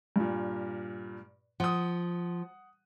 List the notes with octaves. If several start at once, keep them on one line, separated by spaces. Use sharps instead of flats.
G2 A#2
F3 F#5 D#6